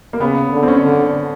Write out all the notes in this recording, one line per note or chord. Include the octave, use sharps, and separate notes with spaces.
A#3
C#3 B3
D3
C4
C#4
D3